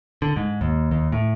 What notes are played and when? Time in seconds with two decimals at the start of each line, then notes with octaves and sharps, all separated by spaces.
0.22 D3
0.36 G#2
0.61 D#2
0.91 D#2
1.12 A2